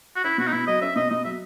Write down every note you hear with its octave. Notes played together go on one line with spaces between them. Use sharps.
F#4
C#4 E4
B2 F#4
D#4
B2 E4
F#3 D#5
C#4 E5
B2 D#5
B2 D#5
F#3 E5